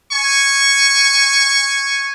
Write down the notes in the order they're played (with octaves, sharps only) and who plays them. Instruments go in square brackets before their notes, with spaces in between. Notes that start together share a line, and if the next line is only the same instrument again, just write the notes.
[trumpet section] G#5 C#6